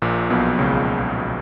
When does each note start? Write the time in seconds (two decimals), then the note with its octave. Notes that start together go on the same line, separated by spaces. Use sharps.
0.02 A#1 A#2
0.30 B1 B2
0.59 C#2 C#3